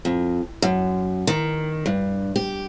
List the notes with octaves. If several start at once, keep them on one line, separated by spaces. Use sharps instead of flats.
F2
F#2
D#3
G2
G4